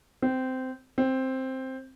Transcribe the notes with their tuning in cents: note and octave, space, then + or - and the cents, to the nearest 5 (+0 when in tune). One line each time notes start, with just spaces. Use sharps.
C4 -15
C4 +5